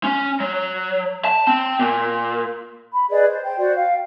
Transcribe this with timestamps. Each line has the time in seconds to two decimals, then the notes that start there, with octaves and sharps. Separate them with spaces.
0.03 C#4
0.40 F#3
1.25 A5
1.47 C4
1.79 A#2
2.92 B5
3.10 G#4 B4 D5 D#5
3.26 C5
3.42 C5 G5
3.58 F#4 C5 D5
3.75 F5 G5